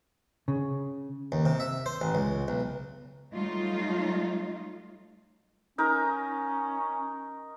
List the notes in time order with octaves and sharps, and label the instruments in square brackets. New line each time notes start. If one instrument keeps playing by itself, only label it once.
[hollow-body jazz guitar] C#3
[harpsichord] D#2
C3
E5
C5
A1
C#2
B1
[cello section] F#3 G3 A3 D#4 F4
[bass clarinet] C#4 [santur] D#4 A#4 A#5